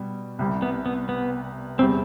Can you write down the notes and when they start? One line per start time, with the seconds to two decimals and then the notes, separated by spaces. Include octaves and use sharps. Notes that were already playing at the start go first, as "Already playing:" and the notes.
Already playing: B2 G3
0.39 C2 C3 G3
0.62 B3
0.86 B3
1.09 B3
1.78 E2 C3 G3 C4